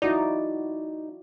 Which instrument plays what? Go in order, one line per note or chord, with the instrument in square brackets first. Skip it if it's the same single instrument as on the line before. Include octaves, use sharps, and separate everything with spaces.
[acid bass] D#4 [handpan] E4 F#4 D5